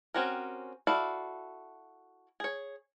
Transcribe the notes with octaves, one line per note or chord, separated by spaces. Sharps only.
C4 C#4 F#4 G4 A#4
E4 F#4 A4 D5 F5
G#4 C#5